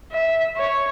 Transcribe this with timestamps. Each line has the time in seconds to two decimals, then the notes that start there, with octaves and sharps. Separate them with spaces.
0.12 E5
0.56 C#5